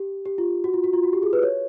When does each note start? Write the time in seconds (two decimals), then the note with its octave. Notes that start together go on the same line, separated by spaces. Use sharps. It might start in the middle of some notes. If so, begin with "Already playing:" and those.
Already playing: G4
0.25 G4
0.38 F4
0.64 F#4
0.74 F4
0.84 F#4
0.93 F4
1.03 F#4
1.13 G4
1.23 G#4
1.33 B4
1.43 C#5